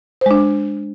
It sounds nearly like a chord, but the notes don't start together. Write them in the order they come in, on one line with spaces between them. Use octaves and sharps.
C5 G#3 D4